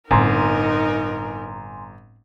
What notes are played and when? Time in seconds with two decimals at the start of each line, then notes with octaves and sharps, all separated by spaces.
0.11 G1 A2 C4 D#4 A#4 G#5 A#5 C6